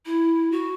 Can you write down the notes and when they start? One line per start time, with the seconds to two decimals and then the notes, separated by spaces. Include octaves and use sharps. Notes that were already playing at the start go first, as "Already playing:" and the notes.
0.06 E4
0.52 F#4